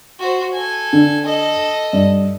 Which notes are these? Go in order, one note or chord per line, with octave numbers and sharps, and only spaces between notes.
F#4 C5
A4 G#5
D3
A4 D#5
G2